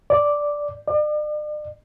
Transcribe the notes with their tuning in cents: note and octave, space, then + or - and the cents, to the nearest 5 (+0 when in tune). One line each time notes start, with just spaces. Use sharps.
D5 -5
D5 +40